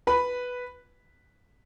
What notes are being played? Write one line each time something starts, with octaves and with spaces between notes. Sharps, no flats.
B4 B5